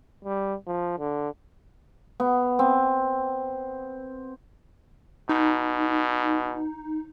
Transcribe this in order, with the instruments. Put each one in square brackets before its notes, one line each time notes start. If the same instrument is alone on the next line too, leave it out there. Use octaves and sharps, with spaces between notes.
[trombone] G3
F3
D3
[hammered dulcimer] B3
C4
[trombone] B2 [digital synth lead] D#4